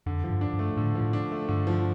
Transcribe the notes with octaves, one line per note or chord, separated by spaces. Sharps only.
F2 D3
F3
G2
D4
G2
A3
A2 D3
F3
A2
D4
A3
G2 D3
F3